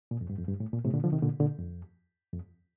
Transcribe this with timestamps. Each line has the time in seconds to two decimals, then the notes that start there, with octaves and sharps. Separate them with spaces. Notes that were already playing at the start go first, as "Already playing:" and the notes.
0.11 A#2
0.21 F2
0.30 G2
0.38 F2
0.48 G2
0.60 A2
0.73 A#2
0.85 A2 C3
0.94 A#2 D3
1.04 D3 F3
1.12 C3 D#3
1.23 A#2 D3
1.40 A#2 D3
1.59 F2
2.33 F2